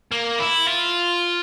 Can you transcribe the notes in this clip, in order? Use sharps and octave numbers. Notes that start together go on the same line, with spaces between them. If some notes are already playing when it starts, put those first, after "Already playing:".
A#3
E4
F4